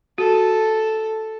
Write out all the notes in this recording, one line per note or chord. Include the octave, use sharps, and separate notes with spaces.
F#4 A4